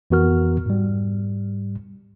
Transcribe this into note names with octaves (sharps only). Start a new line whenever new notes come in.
F2 E3 B3 F#4 A#4 F6
G#2 G3